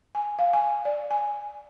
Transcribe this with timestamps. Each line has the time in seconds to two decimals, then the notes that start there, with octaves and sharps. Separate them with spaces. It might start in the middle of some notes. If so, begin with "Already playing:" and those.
0.15 G#5
0.39 F5
0.53 G#5
0.85 D5
1.11 G#5